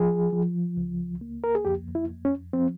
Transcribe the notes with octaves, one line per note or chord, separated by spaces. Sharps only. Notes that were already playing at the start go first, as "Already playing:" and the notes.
Already playing: F3 G#4
F3
C#2
A#3
A#4
G#4
F2 G4
E4
F2
C#4
F3 C4